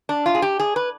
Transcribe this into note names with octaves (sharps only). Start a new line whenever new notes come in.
D4
F4
G#4
G4
G#4
B4